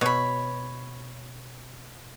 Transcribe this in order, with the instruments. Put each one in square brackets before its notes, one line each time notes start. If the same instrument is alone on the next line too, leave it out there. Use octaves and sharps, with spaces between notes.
[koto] B2 [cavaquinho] C#5 B5